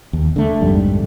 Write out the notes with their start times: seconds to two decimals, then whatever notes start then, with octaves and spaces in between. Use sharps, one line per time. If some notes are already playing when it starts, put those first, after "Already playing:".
0.13 D#2
0.36 D3 A3
0.61 A#1 F2 G#2 G3